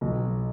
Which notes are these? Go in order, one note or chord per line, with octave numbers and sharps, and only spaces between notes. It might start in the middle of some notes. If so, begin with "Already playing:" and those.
B1 B2